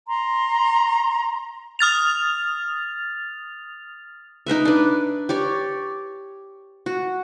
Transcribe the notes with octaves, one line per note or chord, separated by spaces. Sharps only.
A#5 C6
D#6 F6 A6 F7
D#4 A#4 B4 E5
D4 B4
G4 C#5 D5
F#4